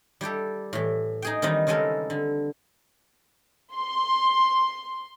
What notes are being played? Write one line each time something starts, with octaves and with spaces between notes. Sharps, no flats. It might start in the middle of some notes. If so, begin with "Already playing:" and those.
G3 E4 G4 A4
A2 E3
D#4 G#4 G5
D#3 E3 G3 C4 D#4
C#3 G3 G#3 C4 A4 A#4
D3
C6